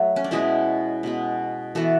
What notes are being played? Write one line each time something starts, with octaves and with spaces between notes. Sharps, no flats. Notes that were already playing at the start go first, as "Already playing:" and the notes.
Already playing: F#3 A3
C#4
D4
B2 G#3 B3 C#4 E4
B2 G#3 B3
E3 B3 F#4 A4